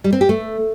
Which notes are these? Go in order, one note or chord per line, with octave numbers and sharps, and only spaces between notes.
G3
C4
G4
A3